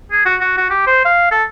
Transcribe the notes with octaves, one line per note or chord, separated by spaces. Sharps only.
G#4
F#4
F#4
F#4
G4
C5
F5
A4